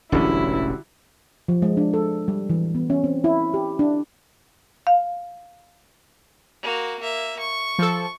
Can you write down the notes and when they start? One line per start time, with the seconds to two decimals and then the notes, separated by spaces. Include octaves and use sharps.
0.12 E1 A1 D3 F#3 G3 C#4 E4
1.48 F3
1.62 G#3
1.77 D4
1.93 A4
2.28 G3
2.50 E3
2.75 B3
2.90 C#4
3.04 C4
3.24 E4
3.54 G4
3.79 D4
4.87 F5
6.63 A#3 F#4
7.00 A#3 E5
7.39 C#6
7.79 F3 A4